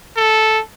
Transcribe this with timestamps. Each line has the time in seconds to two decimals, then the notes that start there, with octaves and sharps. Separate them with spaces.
0.17 A4